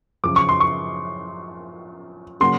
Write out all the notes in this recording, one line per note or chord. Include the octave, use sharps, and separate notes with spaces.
F#2 C#3 F3 D6
C#6
C6
C#6
C#3 F#3 A#3 C6